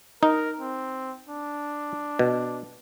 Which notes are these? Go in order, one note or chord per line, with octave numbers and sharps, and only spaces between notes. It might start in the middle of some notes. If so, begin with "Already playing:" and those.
D#4 A#4
C4
D4
B2